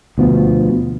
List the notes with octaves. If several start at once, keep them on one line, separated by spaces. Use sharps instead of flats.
D2 B2 F3